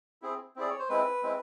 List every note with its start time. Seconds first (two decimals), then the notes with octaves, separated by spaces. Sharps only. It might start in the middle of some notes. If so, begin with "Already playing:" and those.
0.22 C4 E4 G#4
0.56 C4 E4 G#4 D5
0.70 C#5
0.79 C5
0.89 G#3 C4 E4 B4
1.23 G#3 C4 E4